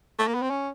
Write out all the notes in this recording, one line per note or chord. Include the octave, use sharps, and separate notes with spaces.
A3
A#3
B3
C4
C#4